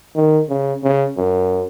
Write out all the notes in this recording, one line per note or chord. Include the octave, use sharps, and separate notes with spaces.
D#3
C#3
C#3
F#2